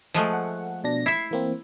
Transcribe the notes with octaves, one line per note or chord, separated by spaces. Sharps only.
F3 G#3 A3
F#5
B2 D4 A#6
E4 E5 C7
E3 A#3 C4